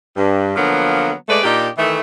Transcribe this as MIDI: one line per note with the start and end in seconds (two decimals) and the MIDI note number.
0.16 0.56 43
0.56 1.12 50
0.56 1.12 53
0.56 1.12 54
0.56 1.12 58
0.56 1.12 59
1.28 1.43 56
1.28 1.43 57
1.28 1.43 71
1.28 1.43 74
1.43 1.68 46
1.43 1.68 62
1.43 1.68 63
1.43 1.68 67
1.78 2.01 51
1.78 2.01 52
1.78 2.01 57